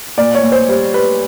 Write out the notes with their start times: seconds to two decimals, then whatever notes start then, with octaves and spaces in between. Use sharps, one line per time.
0.18 A#2 D5
0.35 C#5
0.43 A#2
0.52 C5
0.68 G3 C5
0.93 G3 B4